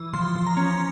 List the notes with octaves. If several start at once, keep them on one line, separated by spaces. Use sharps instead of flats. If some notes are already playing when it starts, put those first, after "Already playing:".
Already playing: E3
F3 C6
F3
A#5
C#4